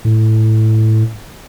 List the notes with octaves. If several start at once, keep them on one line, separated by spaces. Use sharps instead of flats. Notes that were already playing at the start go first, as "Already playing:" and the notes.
A2